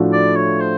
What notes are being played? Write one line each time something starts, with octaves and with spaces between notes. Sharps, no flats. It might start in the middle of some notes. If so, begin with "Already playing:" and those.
Already playing: A2 F3 A3 D4 F#4
D5
C#5
C5